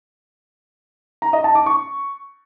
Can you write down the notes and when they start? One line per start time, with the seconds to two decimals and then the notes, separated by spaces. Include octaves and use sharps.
1.22 A#5
1.33 D#5
1.44 A5
1.55 D6
1.66 C#6